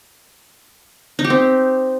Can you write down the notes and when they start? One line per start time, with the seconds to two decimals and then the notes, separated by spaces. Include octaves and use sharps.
1.19 D#4
1.24 G4
1.30 C4